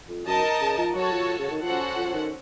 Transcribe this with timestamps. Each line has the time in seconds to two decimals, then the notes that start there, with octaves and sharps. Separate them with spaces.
0.09 F2
0.26 F#2 D#4 A#4 D#5 A5
0.61 C#3
0.78 F3
0.94 F#3 F#4 A4 C#5 A5
1.12 F3
1.39 C#3
1.51 D#3
1.62 F3 C#4 F#4 A4 C5 F#5
1.96 F3
2.14 D#3